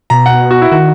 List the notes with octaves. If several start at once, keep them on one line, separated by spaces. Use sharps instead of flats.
B2 A#5
F#5
F#4
E4
D#3 F#4